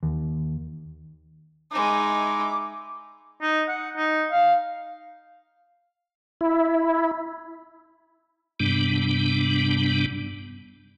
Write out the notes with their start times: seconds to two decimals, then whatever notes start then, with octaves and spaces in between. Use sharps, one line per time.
0.03 D#2
1.72 G#3 D#4 E4 D6
3.42 D#4
3.68 F#5
3.97 D#4
4.32 F5
6.41 E4
8.60 G2 C3 G3 B3 D4